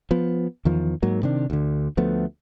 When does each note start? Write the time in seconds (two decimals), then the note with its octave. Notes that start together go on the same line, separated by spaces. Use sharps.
0.11 F3 B3
0.65 E2 D#3 F3
1.02 G#2 F#3 A#3
1.23 C3 D#3 D4
1.50 D2 D3
1.97 D2 F3 A3 B3